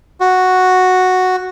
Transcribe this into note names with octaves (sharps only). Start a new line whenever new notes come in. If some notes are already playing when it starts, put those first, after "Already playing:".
F#4